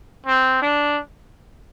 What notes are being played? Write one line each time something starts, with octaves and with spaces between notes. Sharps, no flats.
C4
D4